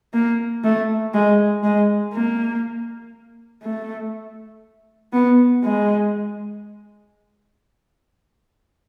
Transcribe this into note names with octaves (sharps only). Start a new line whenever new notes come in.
A#3
A3
G#3
G#3
A#3
A3
B3
G#3